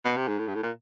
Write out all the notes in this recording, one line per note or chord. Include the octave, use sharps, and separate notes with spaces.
B2
C3
G#2
A2
G2
A2
A#2